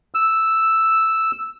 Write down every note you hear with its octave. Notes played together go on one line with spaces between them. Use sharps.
E6